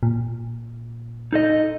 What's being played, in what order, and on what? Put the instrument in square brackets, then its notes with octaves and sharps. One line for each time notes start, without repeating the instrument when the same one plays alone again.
[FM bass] A#2
[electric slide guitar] D#4 A4 D#5